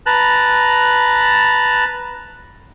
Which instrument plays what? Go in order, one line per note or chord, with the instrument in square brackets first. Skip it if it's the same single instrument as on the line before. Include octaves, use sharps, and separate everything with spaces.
[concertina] B4 A5 A#5 F#6